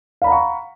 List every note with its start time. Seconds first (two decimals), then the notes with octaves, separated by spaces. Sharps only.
0.22 F5
0.24 B5
0.27 A#5
0.29 F#5
0.32 C#6